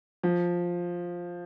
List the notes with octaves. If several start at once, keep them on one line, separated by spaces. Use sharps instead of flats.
F3